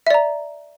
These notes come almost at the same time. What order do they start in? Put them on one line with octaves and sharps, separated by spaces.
E5 D5 A#5